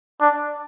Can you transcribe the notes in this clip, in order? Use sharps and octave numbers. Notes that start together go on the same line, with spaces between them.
D4